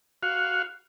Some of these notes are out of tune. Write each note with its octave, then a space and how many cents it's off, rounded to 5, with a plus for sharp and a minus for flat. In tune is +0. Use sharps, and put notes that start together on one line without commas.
F#4 +0 F5 +10